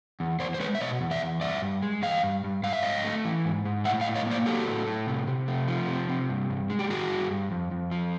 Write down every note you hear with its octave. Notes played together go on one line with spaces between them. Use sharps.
E2
E2 C5 D5
C5
G#3 B4 C#5
E5
B2 C#5 D#5
E2
D5 E5
E2
G2 D5 E5
G2
G#3
E3 D#5 F5
G2
G2
G#2 F5
E5
G#2 D#5 F5
A3
E3
G#2
G#2
A2 E5 F#5
D#5 F5
A2
C#5 D#5
A#3 C5 D5
F#3 G4 A4
A2
A2
C3
C3
A3
F3
C3
C3
G2
G2
G#3
G4
D#3 F#4 G#4
G2
G2
F2
F2
F3